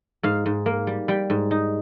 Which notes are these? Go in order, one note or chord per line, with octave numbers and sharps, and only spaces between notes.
G#2 F5
G#2
A#3
G3
G3 G5
G#2
D#4